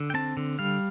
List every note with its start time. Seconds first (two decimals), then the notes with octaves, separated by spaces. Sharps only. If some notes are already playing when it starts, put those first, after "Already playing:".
Already playing: D3
0.10 G5
0.14 C4 A5
0.37 D3
0.59 G3 F5